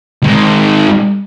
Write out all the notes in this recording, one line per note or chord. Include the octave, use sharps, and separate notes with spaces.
D#3 G#3